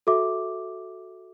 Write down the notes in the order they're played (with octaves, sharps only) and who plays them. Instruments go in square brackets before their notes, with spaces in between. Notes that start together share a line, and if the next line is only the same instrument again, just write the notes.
[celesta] F#4 A4 E5 D6